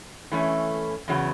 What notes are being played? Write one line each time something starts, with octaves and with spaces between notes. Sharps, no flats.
E3 A3 C#4
E2 C#3 F#3 B3